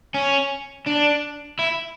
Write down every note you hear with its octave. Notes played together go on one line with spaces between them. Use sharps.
C#4
D4
E4